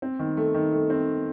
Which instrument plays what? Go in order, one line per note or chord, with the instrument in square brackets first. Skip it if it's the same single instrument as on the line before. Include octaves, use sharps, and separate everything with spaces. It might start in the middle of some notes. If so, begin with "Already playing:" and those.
[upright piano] C4
D#3
A3
D#3
A3
C4